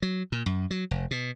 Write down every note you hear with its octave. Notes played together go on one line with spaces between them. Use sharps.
F#3
A#2
F#2
F#3
F1
B2